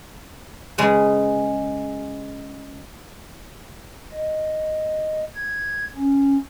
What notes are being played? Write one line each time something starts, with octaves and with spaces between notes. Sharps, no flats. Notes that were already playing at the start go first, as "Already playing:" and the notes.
C#3 G#3 C#4 B4
D#5
G#6
C#4